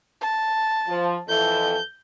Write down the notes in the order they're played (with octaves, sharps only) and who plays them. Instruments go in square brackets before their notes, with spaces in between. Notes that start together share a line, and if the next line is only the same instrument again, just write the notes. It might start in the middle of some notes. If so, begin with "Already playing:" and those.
[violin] A5
[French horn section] F3
[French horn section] F2 E3 A4 [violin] G6